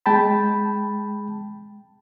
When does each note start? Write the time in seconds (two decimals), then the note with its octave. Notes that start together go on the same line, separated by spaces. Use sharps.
0.06 G#3 G5 A5 B5